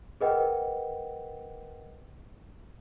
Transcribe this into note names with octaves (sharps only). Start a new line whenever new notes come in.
G#4 A#4 B4 D#5 F#5 G5